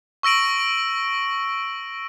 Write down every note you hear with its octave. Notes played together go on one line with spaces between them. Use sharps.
C#6 E6 A#6 D7 F#7